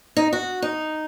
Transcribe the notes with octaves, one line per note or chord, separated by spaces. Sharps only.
D#4
F#4
D#4